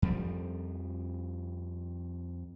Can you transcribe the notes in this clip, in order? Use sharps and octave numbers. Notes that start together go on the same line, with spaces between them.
F2 F3 G3